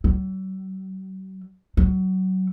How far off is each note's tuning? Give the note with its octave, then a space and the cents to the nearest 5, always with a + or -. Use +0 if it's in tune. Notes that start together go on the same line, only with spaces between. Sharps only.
F#3 +40
F#3 +20